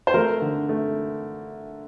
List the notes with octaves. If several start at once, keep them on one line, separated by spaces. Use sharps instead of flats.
C5
A3 A#4
D3
A3